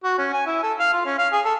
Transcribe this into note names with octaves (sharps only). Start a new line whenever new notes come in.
F#4
C#4
G#5
E4
A4
F5
F4
C#4
F5
G#4
A4